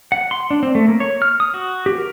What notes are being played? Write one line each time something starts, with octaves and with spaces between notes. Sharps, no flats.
F#5
C6
D4
C4
A3
A#3
C#5
F6
D#6
F#4
G4
A#4